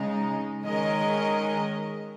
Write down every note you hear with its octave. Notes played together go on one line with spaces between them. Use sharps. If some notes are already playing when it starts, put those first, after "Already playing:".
Already playing: C#3 G#3 D#4
D#3 G#3 C#4 A#4 D#5